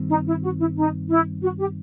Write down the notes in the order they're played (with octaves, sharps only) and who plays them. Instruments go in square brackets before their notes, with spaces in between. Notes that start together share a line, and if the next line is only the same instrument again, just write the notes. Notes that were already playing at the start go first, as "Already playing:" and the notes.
Already playing: [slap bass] G2 D#3 G3 C4
[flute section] D#4
E4
F#4
E4
D#4
E4
F#4
G4